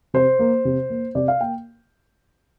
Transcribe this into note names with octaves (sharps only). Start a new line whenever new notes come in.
C3 C5
A#3
C3
A#3
C3 D5
F5
A#3 G5